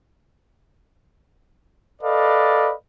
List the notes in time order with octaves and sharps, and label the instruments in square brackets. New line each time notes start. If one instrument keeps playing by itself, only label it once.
[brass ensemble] A4 B4 D5 D#5 F5